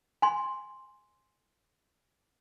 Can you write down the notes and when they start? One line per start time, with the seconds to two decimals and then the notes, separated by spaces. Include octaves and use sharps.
0.22 G#5 C6